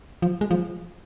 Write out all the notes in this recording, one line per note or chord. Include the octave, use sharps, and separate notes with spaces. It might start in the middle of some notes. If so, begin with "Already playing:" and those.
F3
G#3
F3